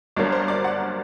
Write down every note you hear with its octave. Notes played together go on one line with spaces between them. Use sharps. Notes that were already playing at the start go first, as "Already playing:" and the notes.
G1 G2 F#3 A#3 D4 D5
C5
D5
F#5